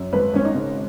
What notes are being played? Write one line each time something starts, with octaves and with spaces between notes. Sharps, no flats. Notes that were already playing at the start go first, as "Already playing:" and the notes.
Already playing: F#2
G#1 B4
G#1 C#4
D#4
C#3